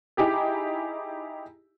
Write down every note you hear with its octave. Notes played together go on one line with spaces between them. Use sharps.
D#4 E4 G4 G#4